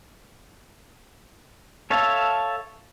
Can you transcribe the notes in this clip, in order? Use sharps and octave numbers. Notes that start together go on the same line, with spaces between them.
A4 C#5 E5 F5 A5